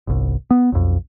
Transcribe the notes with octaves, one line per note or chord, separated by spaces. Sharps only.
G1 C2
B3
B1 F2